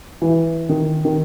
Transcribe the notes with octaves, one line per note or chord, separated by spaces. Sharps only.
E3
D#3
D#3